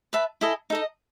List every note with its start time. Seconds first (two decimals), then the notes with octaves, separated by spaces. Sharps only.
0.13 B4 E5 A5
0.41 E4 A4 D#5 G#5
0.70 D#4 A4 D#5